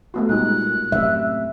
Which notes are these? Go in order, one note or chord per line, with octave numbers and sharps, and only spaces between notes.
A3 B3 F#4
A#2 G3 G#3 D#4 F#6
F#2 A2 C3 E5